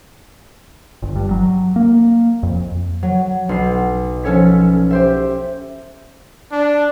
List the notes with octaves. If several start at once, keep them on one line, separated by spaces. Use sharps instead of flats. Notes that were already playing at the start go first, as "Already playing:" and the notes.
G1
G2
F#3
A#3
F2
F#3
B1 C7
F3 C#4 A4 C#5 B6
G4 C5 E5
D4